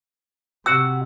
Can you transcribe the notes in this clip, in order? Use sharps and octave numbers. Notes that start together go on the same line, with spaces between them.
C3 F#4 F#5 E6